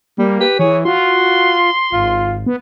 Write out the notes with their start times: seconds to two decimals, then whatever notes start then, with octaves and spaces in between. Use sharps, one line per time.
0.18 G3 A#3
0.40 G4 B4
0.59 E3 G#4 C#5
0.85 F4 F#4 C6
1.92 G#1 F4
2.46 B3